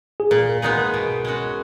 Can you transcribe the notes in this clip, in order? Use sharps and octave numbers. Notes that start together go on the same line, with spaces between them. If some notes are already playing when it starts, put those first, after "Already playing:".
G#4
A#2 A#4
G#3 B3 D#4 G#4
B2
G#3 C#4 F#4